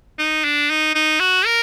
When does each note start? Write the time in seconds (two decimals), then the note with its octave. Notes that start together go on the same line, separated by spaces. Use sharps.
0.19 D#4
0.44 D4
0.70 D#4
0.95 D#4
1.20 F#4
1.46 A#4